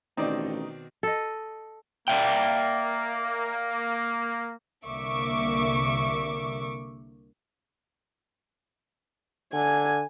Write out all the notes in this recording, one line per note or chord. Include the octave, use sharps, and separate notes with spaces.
A1 B2 D#3 C4 D#4 D5 D#5
A4 D#5
A#3 D5 E5 G5
C2 D3 A#3 E5 C#6 D6
D3 G#5